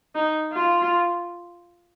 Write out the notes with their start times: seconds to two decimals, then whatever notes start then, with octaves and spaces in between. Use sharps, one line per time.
0.15 D#4
0.53 F4